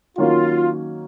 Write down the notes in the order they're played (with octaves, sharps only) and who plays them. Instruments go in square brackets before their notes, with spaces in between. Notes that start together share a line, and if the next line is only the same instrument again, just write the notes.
[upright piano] D#3 F#3 A#3 C#4 F#4 [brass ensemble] F4